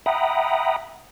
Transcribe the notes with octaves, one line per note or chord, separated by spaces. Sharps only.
E5 F#5 G5 A#5 B5 D#6